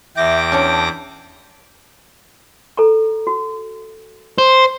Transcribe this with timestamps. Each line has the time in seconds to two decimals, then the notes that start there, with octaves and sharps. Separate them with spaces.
0.17 E2 E5 G5 D6 A#6
0.52 C#4 D4 C#5 A5
2.77 A4 A#5 C#6
3.27 F#4
4.38 C5